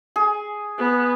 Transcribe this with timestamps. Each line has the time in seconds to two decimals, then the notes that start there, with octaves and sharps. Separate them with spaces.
0.16 G#4
0.78 B3